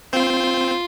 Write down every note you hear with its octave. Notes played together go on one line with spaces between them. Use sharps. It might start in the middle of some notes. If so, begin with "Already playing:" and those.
C4 F4 C5